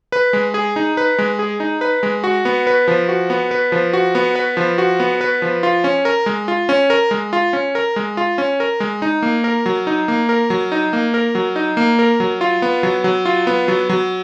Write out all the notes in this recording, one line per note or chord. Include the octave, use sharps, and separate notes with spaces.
B4
G#3
G#4
D#4
B4
G#3
G#4
D#4
B4
G#3
F#4
B3
B4
F3
F#4
B3
B4
F3
F#4
B3
B4
F3
F#4
B3
B4
F3
F4
C#4
A#4
G#3
F4
C#4
A#4
G#3
F4
C#4
A#4
G#3
F4
C#4
A#4
G#3
D#4
A#3
A#4
F#3
D#4
A#3
A#4
F#3
D#4
A#3
A#4
F#3
D#4
A#3
A#4
F#3
F4
B3
F#3
F#3
F4
B3
F#3
F#3